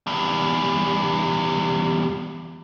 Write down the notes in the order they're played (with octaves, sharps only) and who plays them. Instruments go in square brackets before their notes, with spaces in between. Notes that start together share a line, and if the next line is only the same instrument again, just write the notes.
[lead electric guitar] E2 G3